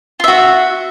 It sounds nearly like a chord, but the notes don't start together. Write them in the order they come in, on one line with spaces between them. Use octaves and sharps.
F4 E5 F#4